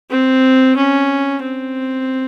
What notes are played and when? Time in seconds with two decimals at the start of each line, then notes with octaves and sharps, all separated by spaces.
0.10 C4
0.77 C#4
1.42 C4